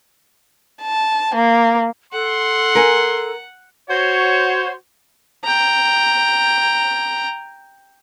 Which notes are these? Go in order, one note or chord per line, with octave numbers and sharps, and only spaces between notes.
A5
A#3
A4 F#5 C6
A#4 G#5
F#4 C5 C#5
G5 A#5